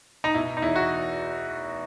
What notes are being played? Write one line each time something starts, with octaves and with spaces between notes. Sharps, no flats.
D#4
B2 E4
D#4
E2 E4
F#4